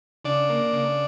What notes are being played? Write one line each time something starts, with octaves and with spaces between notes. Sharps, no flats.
C#3 D4 D5
A#3
C#3